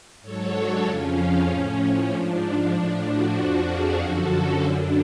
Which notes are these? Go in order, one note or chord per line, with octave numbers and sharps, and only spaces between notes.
G#2 F#3 A4 C#5
D4 F#4
F2 C#3 F3 C#4 F4
A2 F3 C#4
G#2 F3 D4
D4
A2 F3 D4
D4 F#4
F2 F3
F4 G#4
F#2 D3 F3 F#4 A4
C#4
F#2 D3 F#3 D4